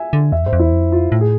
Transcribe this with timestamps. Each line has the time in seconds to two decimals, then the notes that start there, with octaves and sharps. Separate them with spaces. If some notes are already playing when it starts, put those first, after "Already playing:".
Already playing: E5 G#5
0.13 D3
0.32 E2 E5
0.43 F2
0.46 G#2 C5
0.53 F2
0.59 E2 E4
0.72 F2
0.92 F4
1.12 A2
1.21 G#4